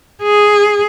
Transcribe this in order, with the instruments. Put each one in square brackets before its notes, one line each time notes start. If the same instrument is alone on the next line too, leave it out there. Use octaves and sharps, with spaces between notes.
[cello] G#4